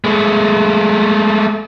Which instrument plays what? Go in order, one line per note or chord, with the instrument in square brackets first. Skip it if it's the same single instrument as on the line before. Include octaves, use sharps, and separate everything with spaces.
[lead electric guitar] G#3 A3